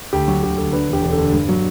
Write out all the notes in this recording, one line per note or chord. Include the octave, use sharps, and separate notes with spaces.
D2 G4
F#3 F#4
D2 G4
D2 A4
D3 B4
E1 G4
E1
A4
D3
G2
F#3